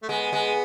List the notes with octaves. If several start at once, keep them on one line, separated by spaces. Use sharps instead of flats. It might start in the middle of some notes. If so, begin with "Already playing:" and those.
A3
G#3 B3
G#3